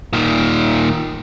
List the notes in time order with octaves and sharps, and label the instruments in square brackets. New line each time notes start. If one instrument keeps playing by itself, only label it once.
[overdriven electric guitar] A#2 D#3